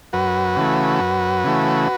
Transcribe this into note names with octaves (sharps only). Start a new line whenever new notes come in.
F#2 F#4 B4
C#3 E3 A3
F#2
C#3 E3 A3